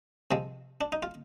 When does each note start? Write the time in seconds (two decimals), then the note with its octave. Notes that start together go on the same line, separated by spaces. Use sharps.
0.31 C3 F3 G#3
0.81 D4
0.92 D#4
1.03 F4